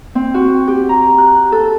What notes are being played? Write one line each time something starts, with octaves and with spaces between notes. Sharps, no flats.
C4
F#4
G4
A#5
F#6
A4